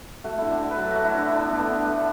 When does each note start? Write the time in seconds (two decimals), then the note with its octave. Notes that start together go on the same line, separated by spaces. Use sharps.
0.24 A3 F#4
0.38 D3 E4
0.51 D4
0.60 D3 E4
0.71 B4
0.77 F#3 A4
0.91 A3 F#4
1.05 E4
1.14 D3 D4
1.31 D3 D4
1.41 B3
1.50 A3
1.59 B3
1.67 D3
1.85 A3